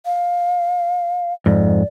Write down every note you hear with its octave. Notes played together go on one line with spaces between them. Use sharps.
F5
F2 G#2 D5